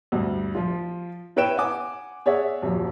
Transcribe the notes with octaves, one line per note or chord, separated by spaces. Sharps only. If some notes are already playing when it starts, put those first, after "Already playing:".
D2 G2
F3 F4
E4 B4 C#5 G5 D7 E7
F#5 G#5 D6
G#4 C#5 D5 E5 F#5
D#1 F#2 F3